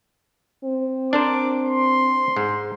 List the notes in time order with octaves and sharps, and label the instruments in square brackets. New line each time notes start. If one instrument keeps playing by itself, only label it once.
[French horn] C4
[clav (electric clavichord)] D4 A#4 C5 [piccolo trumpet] D6
[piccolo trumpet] C6
[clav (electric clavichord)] G#2